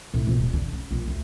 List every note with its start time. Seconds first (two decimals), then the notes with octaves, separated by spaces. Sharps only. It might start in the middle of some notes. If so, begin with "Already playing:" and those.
0.14 A2
0.27 A#1
0.39 D#1
0.53 D3
0.73 C#3
0.91 A#1
1.07 D2